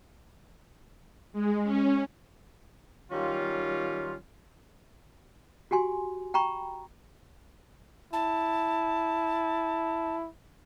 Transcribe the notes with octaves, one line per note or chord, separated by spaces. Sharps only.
G#3
C#4
D#3 F#3 G3 C#4 F4
F#4 G4 G#5 C6
G5 A#5 B5 C#6
E4 A5